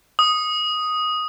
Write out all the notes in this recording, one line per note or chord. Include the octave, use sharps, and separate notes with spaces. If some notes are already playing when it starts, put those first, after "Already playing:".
D#6